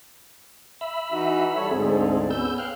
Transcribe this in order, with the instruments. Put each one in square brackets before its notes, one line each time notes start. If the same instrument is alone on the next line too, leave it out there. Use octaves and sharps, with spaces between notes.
[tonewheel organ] E5 B5
[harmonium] E3 D#4 F#4
G3 A4 C#5
[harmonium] D2 G#2 [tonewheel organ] C4 G#4 A4
[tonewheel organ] B3 E6 G6 [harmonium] C#4
[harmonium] F5 [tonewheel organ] G5 F6 F#6